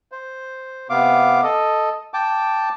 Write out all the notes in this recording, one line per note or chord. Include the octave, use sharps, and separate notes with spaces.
C5
C3 B3 F5 D6
A4 D#5
G5 A5 D6